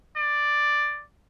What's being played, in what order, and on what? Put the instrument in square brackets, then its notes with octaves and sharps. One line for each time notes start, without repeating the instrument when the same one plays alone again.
[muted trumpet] D5